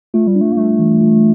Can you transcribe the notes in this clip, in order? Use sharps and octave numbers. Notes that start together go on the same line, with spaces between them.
A3 F4
G3
D4
A3
A#3
G3 A3
E3
F4